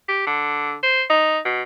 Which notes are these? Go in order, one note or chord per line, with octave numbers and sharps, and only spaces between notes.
G4
D3
C5
D#4
B2